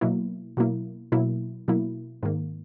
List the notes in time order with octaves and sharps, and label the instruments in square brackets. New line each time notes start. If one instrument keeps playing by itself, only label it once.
[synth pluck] B2 F#3 A#3 E4
B2 F#3 A#3 E4
B2 F#3 A#3 E4
B2 F#3 A#3 E4
G#2 D#3 A#3